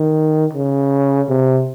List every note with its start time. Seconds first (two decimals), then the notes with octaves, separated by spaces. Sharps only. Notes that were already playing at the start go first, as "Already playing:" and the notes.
Already playing: D#3
0.53 C#3
1.29 C3